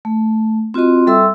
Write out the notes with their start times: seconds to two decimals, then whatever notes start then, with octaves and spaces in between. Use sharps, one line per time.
0.05 A3
0.74 C4 F4 F#4 D#5 C6
1.07 G3 A4 E5 C6 E6